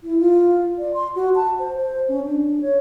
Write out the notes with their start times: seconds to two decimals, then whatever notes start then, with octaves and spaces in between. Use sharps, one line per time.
0.03 E4
0.19 F4
0.78 D5
0.94 C6
1.15 F#4
1.35 A5
1.59 C5
1.77 C5
2.09 C#4
2.26 D4
2.61 C#5